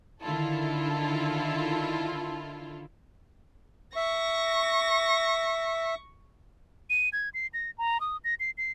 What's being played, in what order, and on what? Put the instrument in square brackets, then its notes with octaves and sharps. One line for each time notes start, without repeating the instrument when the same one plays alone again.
[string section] D3 D#3 E4 F4 A4
[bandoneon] E5 [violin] C#6 A#6
[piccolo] D#7
G#6
C7
A#6
A#5
D#6
A#6
C7
C7